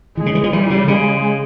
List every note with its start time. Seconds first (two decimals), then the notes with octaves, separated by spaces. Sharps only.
0.17 E3 G#3
0.26 C#3
0.35 E3
0.44 F3
0.53 E3 G3
0.70 C#3
0.87 C#3 G#3